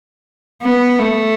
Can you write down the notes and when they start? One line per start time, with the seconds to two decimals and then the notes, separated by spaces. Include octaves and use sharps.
0.63 B3
0.99 A3